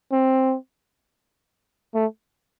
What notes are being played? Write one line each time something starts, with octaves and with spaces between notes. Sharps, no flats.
C4
A3